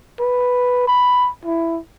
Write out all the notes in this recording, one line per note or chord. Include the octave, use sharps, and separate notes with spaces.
B4
B5
E4